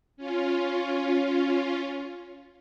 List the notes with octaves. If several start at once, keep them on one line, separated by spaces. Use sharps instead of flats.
C#4 F4